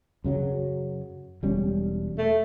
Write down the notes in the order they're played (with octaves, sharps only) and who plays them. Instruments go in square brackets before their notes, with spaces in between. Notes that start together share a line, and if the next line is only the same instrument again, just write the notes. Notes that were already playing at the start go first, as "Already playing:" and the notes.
[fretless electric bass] F#2 C#3 F#3
E1 G3 C#4
[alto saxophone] A3